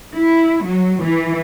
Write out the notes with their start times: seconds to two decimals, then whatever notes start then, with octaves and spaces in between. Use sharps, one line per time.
0.14 E4
0.64 F#3
1.02 E3